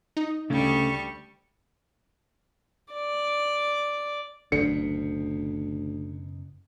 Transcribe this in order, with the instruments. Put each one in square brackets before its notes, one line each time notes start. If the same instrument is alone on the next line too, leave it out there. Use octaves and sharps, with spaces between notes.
[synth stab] D#4
[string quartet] D2 G3 C#6 [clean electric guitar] C#3 A3
[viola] D5
[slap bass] F#1 B2 [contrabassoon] D2 [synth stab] D3 [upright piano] C#7